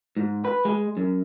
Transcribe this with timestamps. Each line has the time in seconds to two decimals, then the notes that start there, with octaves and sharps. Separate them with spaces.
0.17 G#2
0.45 B4
0.65 G#3
0.97 F#2